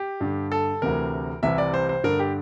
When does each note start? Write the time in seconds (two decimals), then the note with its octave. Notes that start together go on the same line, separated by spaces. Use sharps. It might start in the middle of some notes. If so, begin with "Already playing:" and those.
Already playing: G4
0.21 G2 D3
0.52 A4
0.82 D2 C3 E3 A#4
1.43 C2 C3 E3 E5
1.58 D5
1.74 C5
1.89 C5
2.04 G2 D3 A#4
2.20 G4